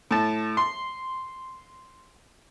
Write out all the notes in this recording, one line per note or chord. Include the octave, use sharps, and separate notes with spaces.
A2 A5
C6